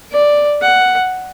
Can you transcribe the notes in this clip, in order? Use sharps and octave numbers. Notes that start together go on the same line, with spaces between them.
D5
F#5